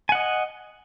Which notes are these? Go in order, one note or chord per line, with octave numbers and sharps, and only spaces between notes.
D#5 F#5 G#5